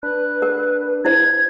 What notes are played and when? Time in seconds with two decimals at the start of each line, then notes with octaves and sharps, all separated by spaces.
0.03 D4 B4 F#6
0.42 A#4
1.05 E4 C5 G#6